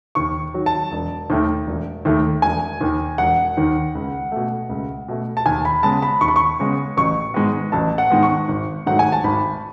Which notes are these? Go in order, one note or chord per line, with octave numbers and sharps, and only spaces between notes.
D#2 C#6
D#3 F#3
A5
E1
D#2 D#3 A3
E1
D#2 D#3 A3
E1 G#5
D#2 D#3
E1 F#5
D#2 D#3
C#2
B2 A3
C#2
B2 A3
A5
D#2 G#5
B5
C#3 G#3 B3 A5
B5
D#2 C#6
B5
C#6
C#3 G#3 B3
A1 C#6
G#2 D#3 G#3 B3
A1 A5
F#5
G#2 D#3 G#3 B3
C#6
G#1
G#2 D#3 F#3 A3 F#5
G#5
A5
G#1 B5